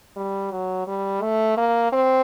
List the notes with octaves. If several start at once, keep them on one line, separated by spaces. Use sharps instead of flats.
G3
F#3
G3
A3
A#3
C4